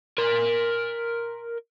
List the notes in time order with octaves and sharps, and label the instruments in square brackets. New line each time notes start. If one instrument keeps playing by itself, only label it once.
[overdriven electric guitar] A#4 C6